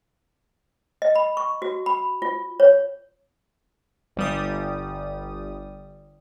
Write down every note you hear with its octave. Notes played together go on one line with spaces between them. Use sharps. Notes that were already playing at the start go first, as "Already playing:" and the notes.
D#5
B5
C#6
F#4
B5
F4
C#5
G1 G3 D#6